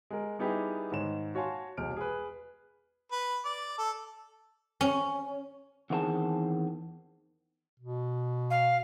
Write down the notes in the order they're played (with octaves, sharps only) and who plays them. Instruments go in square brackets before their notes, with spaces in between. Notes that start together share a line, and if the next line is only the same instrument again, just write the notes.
[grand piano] G#3 A#4
G3 B3 D#4 E4 G4 G#4
G#2 D#3 C#5 E7
F#4 C#5 F5 G#5 A5 C6
E1 C2 G#3 F6 D7
G#4 B4
[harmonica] B4
D5
A4
[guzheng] C#4
[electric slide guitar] E2 D#3 C4 F4 G#4 A5
[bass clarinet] B2
[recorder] F5